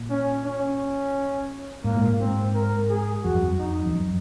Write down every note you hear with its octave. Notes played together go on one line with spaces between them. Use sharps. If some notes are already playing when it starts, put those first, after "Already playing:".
Already playing: A#2
C#4
C#4
G#2 A#3
A#2
G#2
C4
A#4
G#4
F2 F#4
F#2
F2
D#4
F2
F#2